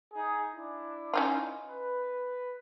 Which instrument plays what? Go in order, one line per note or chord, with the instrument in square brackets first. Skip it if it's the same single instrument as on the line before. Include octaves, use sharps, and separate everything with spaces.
[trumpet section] D#4 G#4
D4 E4
[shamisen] C#4 D#4 F4
[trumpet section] B4